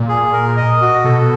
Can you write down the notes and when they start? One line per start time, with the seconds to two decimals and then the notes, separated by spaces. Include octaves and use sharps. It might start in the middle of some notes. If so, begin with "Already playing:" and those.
Already playing: A#2
0.09 G#4
0.33 A#4
0.57 D#5
0.81 F#4
1.04 B2 A4